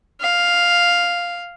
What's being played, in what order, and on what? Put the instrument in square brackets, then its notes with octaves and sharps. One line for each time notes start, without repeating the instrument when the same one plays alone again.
[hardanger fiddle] F5